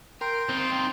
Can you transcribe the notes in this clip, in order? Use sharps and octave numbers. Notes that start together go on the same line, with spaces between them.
A#4 G5 C6
C4 D#4 F4